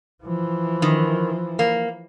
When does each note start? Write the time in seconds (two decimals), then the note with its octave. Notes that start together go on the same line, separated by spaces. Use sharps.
0.24 E3 F3
0.82 D#3
1.59 A#3